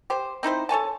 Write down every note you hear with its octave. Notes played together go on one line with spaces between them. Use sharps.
G4 C5
C4 D#4 E4 C5
A4 C#5 G#5 A5